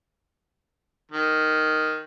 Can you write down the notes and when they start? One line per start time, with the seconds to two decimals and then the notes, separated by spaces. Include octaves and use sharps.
1.11 D#3